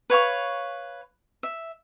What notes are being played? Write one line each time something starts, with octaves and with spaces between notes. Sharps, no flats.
B4 C#5 F5 C#6
E5